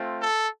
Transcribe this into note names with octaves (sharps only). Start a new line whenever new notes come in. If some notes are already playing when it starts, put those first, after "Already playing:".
Already playing: A3 C4 F4
A4